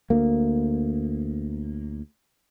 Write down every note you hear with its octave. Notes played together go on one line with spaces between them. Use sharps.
D2 A#3